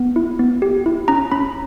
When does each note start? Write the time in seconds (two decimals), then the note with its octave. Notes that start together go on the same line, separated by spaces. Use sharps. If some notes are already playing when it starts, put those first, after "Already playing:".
Already playing: B3
0.16 E4
0.39 B3
0.62 G4
0.86 E4
1.08 C#4 A#5
1.32 C#4 B5